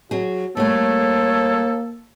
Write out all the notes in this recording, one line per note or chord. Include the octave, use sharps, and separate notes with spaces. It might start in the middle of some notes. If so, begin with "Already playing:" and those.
F#3 F#4 G#4
G3 A3 A#3 A4 C#5